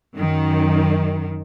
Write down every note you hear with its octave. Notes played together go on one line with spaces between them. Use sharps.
F#2 D#3